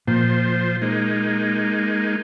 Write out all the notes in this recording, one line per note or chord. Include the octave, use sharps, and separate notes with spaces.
A#2 F3 C5
G#3 A#3 D#4